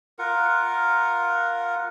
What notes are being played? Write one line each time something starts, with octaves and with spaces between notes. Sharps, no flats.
F4 A#4 F#5